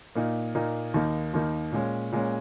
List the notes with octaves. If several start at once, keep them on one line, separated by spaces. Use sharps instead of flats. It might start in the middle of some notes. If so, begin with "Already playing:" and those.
A#2 A#3 D#4
A#2 A#3 D#4
D#2 D#3 A#3 D#4
D#2 D#3 A#3 D#4
A#2 G#3 C#4
A#2 G#3 C#4